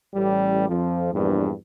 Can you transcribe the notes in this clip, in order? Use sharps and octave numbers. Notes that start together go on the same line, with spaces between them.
A1 G3
F2 F3
A#1 E2 G2